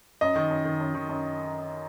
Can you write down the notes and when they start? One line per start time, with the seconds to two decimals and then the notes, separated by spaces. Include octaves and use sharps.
0.21 F#2 D#5
0.36 D#3
0.50 F#2
0.65 D#3
0.80 F#2
0.94 D#3
1.09 F#2